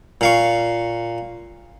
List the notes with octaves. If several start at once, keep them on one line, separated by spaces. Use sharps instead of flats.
A#2 F5 C#6